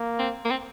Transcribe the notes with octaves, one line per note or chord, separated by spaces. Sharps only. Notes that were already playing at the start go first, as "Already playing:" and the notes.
Already playing: A#3
C4
A#3
C4